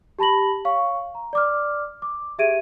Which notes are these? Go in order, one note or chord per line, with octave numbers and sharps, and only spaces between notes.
G4 A5 B5 A#6 F#7
C#5 F5 C#6
A#5
D5 D6 F6
D6
G4 G#4 E5 G#6 D7 D#7